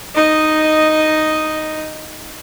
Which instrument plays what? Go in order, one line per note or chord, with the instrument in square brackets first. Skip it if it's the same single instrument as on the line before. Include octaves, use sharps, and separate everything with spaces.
[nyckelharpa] D#4 D#5